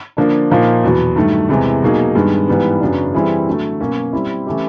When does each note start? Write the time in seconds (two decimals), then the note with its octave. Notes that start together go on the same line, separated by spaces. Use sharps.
0.17 D3 F3 A#3 D4
0.51 A#2 F3 A#3 D#4
0.84 E2 B2 F#3 B3
1.16 G2 D#3 F#3 A3
1.49 E2 C3 E3 G#3
1.82 B2 F#3 A#3 D#4 G#4
2.15 G2 D#3 G#3 B3
2.48 G#2 E3 G3 B3
2.81 F#2 C#3 F#3 B3 D4
3.14 E3 G3 C4 E4 G#4
3.47 D3 F#3 A3
3.80 B2 F#3 A#3 C#4
4.12 G3 C4 E4
4.47 E3 A3 C#4 E4 G4